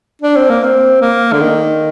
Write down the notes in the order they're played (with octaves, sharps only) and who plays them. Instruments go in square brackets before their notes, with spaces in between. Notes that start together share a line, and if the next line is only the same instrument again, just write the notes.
[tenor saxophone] D4
C4
A#3
C4
A#3
D3
D#3